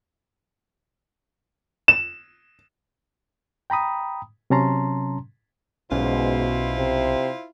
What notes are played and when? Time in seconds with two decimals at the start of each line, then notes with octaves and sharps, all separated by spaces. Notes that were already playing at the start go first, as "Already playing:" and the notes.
1.88 E7
3.70 G5 A#5 B5 D#6
4.50 C3 F#3 C#4 A5 A#5 C6
5.92 B1 G#2 B2 C#4 E4 F4 C5
6.78 C3